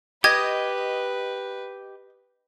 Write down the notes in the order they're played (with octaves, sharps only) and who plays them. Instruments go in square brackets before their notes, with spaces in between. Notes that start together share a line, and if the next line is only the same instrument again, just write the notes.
[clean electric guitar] G4 [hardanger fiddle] B4 [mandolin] D#5 [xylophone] G#6